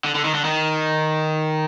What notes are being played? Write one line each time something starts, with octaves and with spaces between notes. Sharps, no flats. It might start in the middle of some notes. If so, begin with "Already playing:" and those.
D3
D3
D#3
D3
D#3